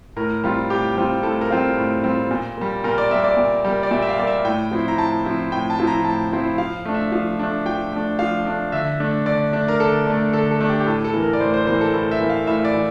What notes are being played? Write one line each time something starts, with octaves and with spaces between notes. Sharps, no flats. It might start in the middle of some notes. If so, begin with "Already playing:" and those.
A2 A#4
G3 C4 F4
A2 G4
G3 C4 F4
A2 A4
A#4
G3 C4 F4
A2
G3 C4 F4
A#2
G3 A#3
A#2 A#4
D5
G3 A#3 E5
D5
A#2
G3 A#3
D5
A#2 E5
E5
F5
G3 A#3 D5
E5
A2 G5
F3 C4 E4
A#5
A2 A5
F3 C4 E4
A2 G5
A5
F3 C4 E4
A#5
A2 A5
F3 C4 E4
F3 F5
A3 D4
E5
F3 F5
A3 D4
F3 G5
A3 D4
F3 F5
A3 D4
D3 E5
A3 D4
D3 D5
A3 D4
A#4
D3 A4
A3 D4
D3 A4
A4
A3 D4
G4
G4
A2 A4
A4
E3 A#3
A#4
D5
A2 C5
C5
E3 A#3 C5
A4
A2 A4
E5
E3 A#3
F5
A2 E5
D5
E3